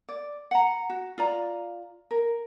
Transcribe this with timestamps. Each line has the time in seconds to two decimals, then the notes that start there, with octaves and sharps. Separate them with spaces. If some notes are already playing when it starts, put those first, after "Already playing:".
0.09 D5
0.51 F#5 A#5
0.89 F#4
1.18 F4 D5 A#5
2.11 A#4